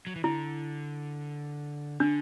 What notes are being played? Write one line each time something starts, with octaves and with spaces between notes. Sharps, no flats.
F#3
E3
D3 E4
D3 D4